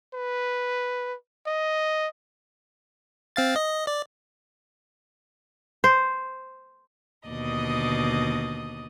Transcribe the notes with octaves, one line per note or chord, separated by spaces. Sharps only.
B4
D#5
C4 F5 A6
D#5
D5
C5
D#2 B2 D3 D5 D#5 D#6